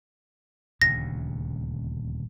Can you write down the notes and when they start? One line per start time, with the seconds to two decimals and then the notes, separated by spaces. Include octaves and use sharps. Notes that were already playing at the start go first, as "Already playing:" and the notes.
0.82 D#1 D2 C#3 A#6